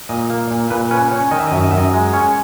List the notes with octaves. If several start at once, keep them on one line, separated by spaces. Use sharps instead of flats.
A#2 D#5
A#3
A#2
A#2 B4
C#4 B4
C#4 C#5
D#3 D#5
E5
D#5
F#2 E5
D#5
F#2 E5
D#5
G#3
C#4 C#5